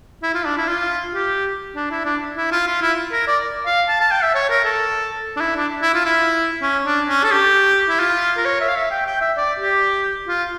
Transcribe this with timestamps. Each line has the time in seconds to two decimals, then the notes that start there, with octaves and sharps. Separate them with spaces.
0.23 E4
0.35 F4
0.46 D4
0.57 E4
0.69 F4
1.14 G4
1.76 D4
1.91 E4
2.05 D4
2.37 E4
2.52 F4
2.67 F4
2.82 E4
3.12 A#4
3.28 D5
3.66 F5
3.88 A5
4.00 A5
4.12 G5
4.23 E5
4.35 C#5
4.50 A#4
4.65 A4
5.37 D4
5.41 E4
5.56 D4
5.82 E4
5.94 F4
6.05 E4
6.62 C#4
6.85 D4
7.08 C#4
7.24 A4
7.31 G4
7.89 E4
8.00 F4
8.38 A#4
8.45 C#5
8.61 E5
8.69 F5
8.76 E5
8.91 G5
9.06 G5
9.21 E5
9.37 D5
9.59 G4
10.28 F4